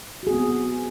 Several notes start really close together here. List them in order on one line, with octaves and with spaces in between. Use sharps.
F#4 G#4 C4 B3